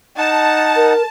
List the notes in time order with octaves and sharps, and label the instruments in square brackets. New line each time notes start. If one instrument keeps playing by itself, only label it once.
[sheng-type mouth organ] D#4 F#5 [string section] A5
[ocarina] A#4